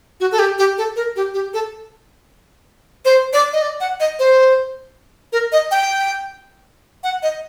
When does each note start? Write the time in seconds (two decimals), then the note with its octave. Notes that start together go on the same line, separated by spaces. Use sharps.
0.20 F#4
0.32 A4
0.39 G4
0.58 G4
0.78 A4
0.96 A#4
1.16 G4
1.34 G4
1.54 A4
3.05 C5
3.33 D5
3.53 D#5
3.62 D5
3.80 F#5
4.00 D#5
4.19 C5
5.32 A#4
5.52 D#5
5.71 G5
7.04 F#5
7.23 D#5